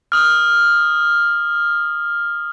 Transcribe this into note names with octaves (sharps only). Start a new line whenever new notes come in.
D#6 F6